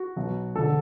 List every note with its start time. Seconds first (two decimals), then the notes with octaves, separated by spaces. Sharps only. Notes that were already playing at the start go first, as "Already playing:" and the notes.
Already playing: F#4
0.16 B1 B2
0.56 E1 D3 A4